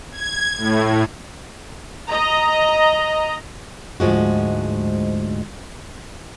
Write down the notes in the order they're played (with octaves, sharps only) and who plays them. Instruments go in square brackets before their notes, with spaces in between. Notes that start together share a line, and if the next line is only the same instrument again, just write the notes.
[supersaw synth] G#6
A2
[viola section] D#5 A#5
[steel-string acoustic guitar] D2 G#2 F3 G#3 F#4